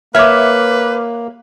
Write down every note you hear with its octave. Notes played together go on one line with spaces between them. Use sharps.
A#3 B4 C#5 E5 D6 F6